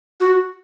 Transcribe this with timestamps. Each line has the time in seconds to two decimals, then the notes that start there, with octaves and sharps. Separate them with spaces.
0.20 F#4